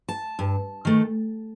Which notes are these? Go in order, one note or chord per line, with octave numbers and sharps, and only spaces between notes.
A5
G2
D#3 A3